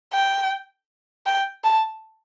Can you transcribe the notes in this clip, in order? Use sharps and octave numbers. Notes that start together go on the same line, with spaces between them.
G5
G5
A5